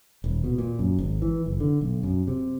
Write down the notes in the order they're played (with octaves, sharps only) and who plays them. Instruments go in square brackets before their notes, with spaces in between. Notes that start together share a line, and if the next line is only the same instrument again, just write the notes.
[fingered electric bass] D#1
B2
A#2
F#2
G#1
E3
F#1
D3
B1
F#2
C3